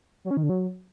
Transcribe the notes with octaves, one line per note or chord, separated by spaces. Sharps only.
F#3
C#4
D#3
D3
F#3